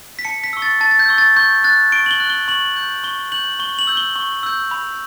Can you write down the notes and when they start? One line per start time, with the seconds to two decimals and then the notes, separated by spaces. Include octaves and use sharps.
0.19 B6
0.25 A5 C#7
0.44 B6
0.53 C#6 E6
0.62 A6
0.81 A5 A6
0.91 A6
0.99 G6
1.09 C#6 E6
1.18 A6
1.36 C#6 G6
1.64 F#6 A6
1.92 C#6 D7
2.06 F#7
2.11 G7
2.20 F#6
2.30 G7
2.48 C#6 F#7
2.76 G6
3.04 C#6 G7
3.32 G6 F#7
3.59 C#6 G7
3.79 F#7
3.87 E6 G6
3.97 G7
4.16 C#6
4.43 E6 G6
4.71 B5